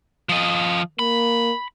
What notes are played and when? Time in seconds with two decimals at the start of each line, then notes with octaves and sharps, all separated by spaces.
0.29 F3 D#5
0.99 A#3 B5